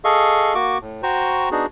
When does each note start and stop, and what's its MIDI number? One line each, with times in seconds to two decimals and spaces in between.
0.04 0.54 68
0.04 0.54 69
0.04 0.54 75
0.04 0.54 77
0.04 0.54 85
0.55 0.78 58
0.55 0.78 66
0.55 0.78 85
0.55 0.78 86
0.81 1.02 45
1.03 1.49 66
1.03 1.49 72
1.03 1.49 79
1.03 1.49 82
1.03 1.49 85
1.51 1.66 59
1.51 1.66 62
1.51 1.66 63
1.51 1.66 66
1.51 1.66 68